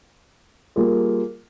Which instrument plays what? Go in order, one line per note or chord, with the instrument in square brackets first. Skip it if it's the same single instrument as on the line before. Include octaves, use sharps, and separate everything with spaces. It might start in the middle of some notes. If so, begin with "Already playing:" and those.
[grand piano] G3 A#3 F4 G#4